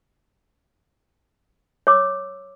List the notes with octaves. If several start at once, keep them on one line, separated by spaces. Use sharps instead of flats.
C#5 D6 E6